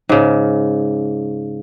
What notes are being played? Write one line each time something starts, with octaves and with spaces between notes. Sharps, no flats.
G#2 C#3